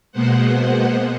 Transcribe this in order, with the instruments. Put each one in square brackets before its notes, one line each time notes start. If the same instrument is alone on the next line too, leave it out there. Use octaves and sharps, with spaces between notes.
[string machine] B2 G#3 A#3 B3 C5 F#5